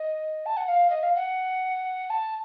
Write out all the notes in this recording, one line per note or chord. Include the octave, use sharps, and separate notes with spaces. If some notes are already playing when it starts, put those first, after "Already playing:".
Already playing: D#5
A5
F#5
F5
D#5
F5
F#5
A5